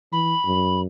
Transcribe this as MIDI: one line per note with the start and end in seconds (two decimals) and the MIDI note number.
0.12 0.34 52
0.12 0.80 83
0.46 0.87 42